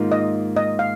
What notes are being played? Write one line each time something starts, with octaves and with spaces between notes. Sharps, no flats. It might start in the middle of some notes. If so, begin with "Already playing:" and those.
Already playing: G#2 D#3 A#3 F4
D#5
D#5
F5